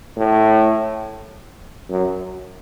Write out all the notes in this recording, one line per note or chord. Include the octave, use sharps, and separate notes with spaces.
A2
F#2